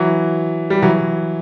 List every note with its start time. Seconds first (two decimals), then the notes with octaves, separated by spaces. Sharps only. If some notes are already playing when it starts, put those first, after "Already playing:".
Already playing: E3 F#3
0.70 G3
0.82 E3 F#3